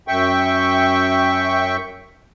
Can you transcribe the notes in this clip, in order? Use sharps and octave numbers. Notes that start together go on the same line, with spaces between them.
F#2 E5 G5 C#6